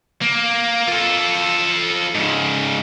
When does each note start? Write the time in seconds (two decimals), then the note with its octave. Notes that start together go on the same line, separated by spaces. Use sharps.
0.22 A#3
0.88 F4 A4
2.15 G#2 C#3